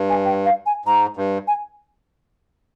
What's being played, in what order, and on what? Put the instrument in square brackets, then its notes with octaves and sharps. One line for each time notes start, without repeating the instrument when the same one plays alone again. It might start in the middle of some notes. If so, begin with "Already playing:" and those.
Already playing: [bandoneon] G2
[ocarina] G#5
G5
F5
G#5
[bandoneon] G#2 [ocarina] A#5
[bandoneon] G2
[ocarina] G#5